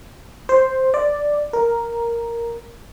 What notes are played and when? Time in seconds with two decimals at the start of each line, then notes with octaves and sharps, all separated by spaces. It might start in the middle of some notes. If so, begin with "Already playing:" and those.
0.49 C5
0.94 D5
1.53 A#4